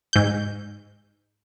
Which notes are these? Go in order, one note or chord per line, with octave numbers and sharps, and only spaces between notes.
G#2 G6